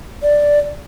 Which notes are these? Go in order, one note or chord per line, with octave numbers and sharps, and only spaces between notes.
D5